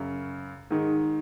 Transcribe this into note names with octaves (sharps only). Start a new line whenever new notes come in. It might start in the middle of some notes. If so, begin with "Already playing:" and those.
Already playing: F#2 C#3
G#2 D#3